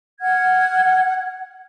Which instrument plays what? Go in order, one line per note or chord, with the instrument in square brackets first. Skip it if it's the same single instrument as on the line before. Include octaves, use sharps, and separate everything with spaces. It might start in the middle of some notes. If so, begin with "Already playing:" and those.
[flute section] F#5 F6 G#6